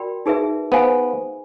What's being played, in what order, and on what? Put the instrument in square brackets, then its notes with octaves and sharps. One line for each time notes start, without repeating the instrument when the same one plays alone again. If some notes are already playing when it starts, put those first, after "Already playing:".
Already playing: [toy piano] F#4 A#4 D5 G5 B5
D#4 G#4 B4 E5
[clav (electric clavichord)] B3 [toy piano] C5 F5 G#5